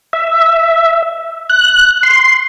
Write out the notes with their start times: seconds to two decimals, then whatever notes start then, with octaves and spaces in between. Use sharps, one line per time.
0.13 E5
1.50 F#6
2.03 C6